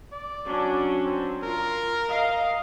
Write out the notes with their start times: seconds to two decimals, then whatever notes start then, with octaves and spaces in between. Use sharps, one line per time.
0.12 D5
0.46 F#3 C#4 D4
1.03 C4
1.43 F4 A#4
2.09 D#5 F5